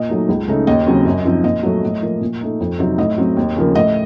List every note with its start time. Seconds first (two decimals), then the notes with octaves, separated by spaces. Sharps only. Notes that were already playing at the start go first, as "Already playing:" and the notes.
Already playing: A#2 D#5
0.09 F#3 A3 D#4
0.29 C#2
0.48 C#3 A3 D#4
0.67 D#2 D#5
0.87 C#3 F#3 C4
1.05 F#2
1.25 F3 C4 D#4
1.44 A#2 D#5
1.63 F#3 A3
1.83 A2
2.02 F3 A#3
2.21 A#2
2.41 A3 D#4
2.60 F2
2.79 C3 F#3 C4 D#4
2.98 A2 D#5
3.18 F#3 C4
3.37 D#2
3.56 C#3 F3 A#3
3.75 A2 D#5